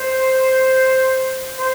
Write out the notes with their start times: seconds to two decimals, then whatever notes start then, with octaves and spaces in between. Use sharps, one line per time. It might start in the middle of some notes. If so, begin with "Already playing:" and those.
Already playing: C5
1.59 C5